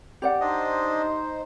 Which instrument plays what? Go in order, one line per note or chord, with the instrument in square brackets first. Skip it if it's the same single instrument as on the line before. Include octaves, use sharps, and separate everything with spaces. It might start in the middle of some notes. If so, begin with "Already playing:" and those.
[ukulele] G4 D5 F#5
[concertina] D4 D#5 [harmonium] D#4 C5